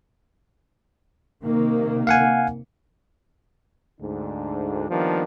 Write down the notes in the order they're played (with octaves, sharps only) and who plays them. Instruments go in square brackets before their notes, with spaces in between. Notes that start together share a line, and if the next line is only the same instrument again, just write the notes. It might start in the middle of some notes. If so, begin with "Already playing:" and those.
[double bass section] C3 D#3 A#3
[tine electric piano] F5 F#5 G#5
[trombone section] D2 G#2 D4
D#3 F3 G3 A#3 B3 D4